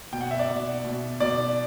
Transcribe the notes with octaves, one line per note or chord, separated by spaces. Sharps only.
B2 G5
F#5
E5
D5
B2
B2
B2 D5